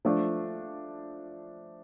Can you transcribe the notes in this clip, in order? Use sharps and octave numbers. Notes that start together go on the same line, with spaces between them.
F3 A3 D4